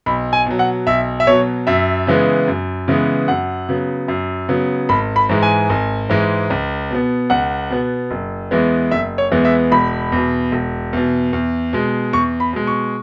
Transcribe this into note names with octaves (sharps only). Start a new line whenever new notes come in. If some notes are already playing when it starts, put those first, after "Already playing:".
B1 B5
G#5
B2 F#3
F#5
B1 E5
E5
B2 F#3 C#5
F#2 E5
C#3 E3 G#3 B3
F#2
C#3 E3 G#3 B3
F#2 F#5
C#3 F#3 B3
F#2
C#3 F#3 B3
G#1 B5
B5
G#2 E3 G#3
G#5
G#1
G#2 E3 G#3
C#2
B2 B3
C#2 F#5
B2 B3
F#1
E2 E3 G#3 B3
F#1 E5
C#5
E2 E3 G#3 B3
E5
E1 B5
E2 B2
E1
E2 B2
E2
B2 G#3
E2 C#6
B5
B2 G#3
C#6